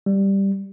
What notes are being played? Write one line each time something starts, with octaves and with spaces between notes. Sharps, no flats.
G3